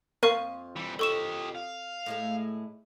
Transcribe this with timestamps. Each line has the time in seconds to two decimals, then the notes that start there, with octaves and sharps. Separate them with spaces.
0.23 F2 A#3 F5 C#6 D#7
0.76 E3 G3
0.99 G4 A4 D#5 C#6 E7
1.55 F5
2.06 A2 G#3 A3